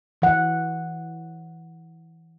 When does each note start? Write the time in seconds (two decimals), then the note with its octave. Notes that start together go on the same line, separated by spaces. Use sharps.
0.22 E3 F#5